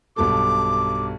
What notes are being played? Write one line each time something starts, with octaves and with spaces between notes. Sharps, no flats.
B1 G2 A4 D6